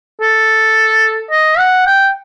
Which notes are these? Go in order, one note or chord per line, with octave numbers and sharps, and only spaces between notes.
A4
D#5
F#5
G5